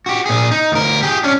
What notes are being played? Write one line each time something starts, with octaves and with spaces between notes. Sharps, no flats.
F#4 G4
A#2 G#4
D#4
D2 A#4
G4 G#4
C#4 D4